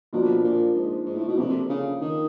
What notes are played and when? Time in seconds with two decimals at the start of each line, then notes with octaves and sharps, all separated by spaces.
0.13 B2 F3 A#3 D4 F4
0.44 A#2
0.75 G#2
1.06 G#2
1.16 A2
1.28 B2
1.38 C3 F3 A#3 D4 F4 A4
1.69 C#3
2.01 D#3